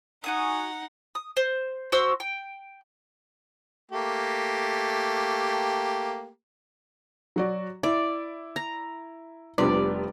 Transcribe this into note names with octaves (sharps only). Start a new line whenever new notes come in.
D#4 F#4 F#5 G#5 D#6
D#6
C5
F#4 C5 C6 E6
G5
A3 A#3 G4
F#3 F#4 D5
E4 D5
A#5
F1 C3 G3 B3 D4 F4 D5